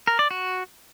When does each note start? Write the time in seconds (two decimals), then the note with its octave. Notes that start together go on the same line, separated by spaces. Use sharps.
0.07 A#4
0.19 D5
0.31 F#4